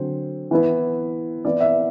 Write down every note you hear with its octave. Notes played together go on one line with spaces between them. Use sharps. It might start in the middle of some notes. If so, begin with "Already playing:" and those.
Already playing: D3 F#3 C4 C5
E3 B3 E4
E3 B3 E4 D5
E5